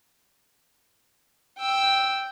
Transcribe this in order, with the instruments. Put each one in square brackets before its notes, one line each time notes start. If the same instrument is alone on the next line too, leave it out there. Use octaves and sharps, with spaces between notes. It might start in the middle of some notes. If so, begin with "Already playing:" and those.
[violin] G5 E6